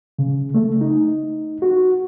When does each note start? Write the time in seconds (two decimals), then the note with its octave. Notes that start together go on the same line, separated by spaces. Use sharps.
0.19 C#3
0.54 A3
0.81 D#4
1.62 F#4